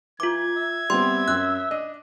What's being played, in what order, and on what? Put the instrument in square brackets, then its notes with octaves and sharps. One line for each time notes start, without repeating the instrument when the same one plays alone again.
[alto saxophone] E3 [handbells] F4 D6 [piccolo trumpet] G#6
[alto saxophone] E5
[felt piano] G3 B3 C4 [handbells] C6
[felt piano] F#2 [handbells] F#6
[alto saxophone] D4 [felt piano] D#5